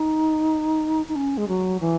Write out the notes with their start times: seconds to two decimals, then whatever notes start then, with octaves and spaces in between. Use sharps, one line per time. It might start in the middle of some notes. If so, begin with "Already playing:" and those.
Already playing: D#4
1.09 D#4
1.16 C#4
1.38 G#3
1.48 F#3
1.80 E3